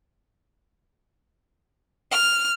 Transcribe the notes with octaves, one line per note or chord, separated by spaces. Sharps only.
F6